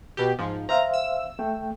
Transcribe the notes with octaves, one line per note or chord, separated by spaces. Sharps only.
B2 G4
G#2 F3
C5 E5 F5 A#5
E6
A3 G5